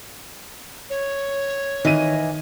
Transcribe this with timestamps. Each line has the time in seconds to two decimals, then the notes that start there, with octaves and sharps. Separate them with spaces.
0.90 C#5
1.85 D#3 E3 D#5 D#7